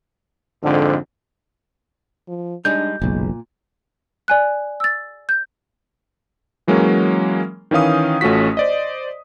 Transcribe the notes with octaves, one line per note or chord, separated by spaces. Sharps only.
F2 G#2 D3
F3
G3 G#3 D4 D#4 G6
F#1 B1 A#2 G#3
D5 G#5 F#6
E6 A6
G6
E3 F#3 G#3 A#3 C#4
D#3 E3 C#4 F5 D#6
A1 A3 C#4 F4 F#4 B6
C5 D5 D#5